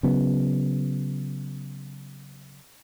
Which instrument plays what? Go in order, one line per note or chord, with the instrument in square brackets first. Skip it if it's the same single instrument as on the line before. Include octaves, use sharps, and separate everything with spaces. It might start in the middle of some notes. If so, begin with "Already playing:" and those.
[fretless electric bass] C#3 F#3 B3